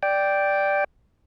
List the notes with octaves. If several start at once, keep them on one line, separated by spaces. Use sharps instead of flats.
D5 G5